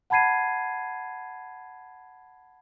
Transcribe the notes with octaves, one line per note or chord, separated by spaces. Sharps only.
F#5 A5 B5 G#6 C7 D#7